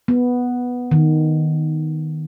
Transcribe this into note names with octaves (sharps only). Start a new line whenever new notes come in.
B3
D#3